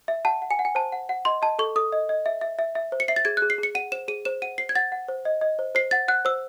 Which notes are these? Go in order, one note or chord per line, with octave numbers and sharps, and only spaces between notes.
E5
F#5 A5
F#5
G#5
F#5
G#5
C5 A5
F#5
F#5
D#5 C6
D#5 A5
A4 C#6
A4 D#6
D#5
D#5
E5
E5
E5
E5
C5
C#7
E5 C7
A6
G#4 G#6
F#6
G#4
C7
G#4
C#7
F#5 D#7
C5 E7
G#4 D#7
C5 E7
F#5 D#7
C5 C7
G#6
F#5 A6
F#5
C5
D#5
D#5
C5
C5 C7
F#5 A6
F#5 F#6
C5 E6